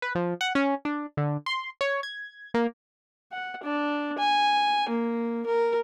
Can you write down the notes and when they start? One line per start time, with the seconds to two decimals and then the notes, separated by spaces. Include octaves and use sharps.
0.02 B4
0.15 F3
0.41 F#5
0.55 C#4
0.85 D4
1.17 D3
1.46 C6
1.81 C#5
2.03 G#6
2.54 A#3
3.32 F#5
3.63 D4
4.18 G#5
4.89 A#3
5.46 A#4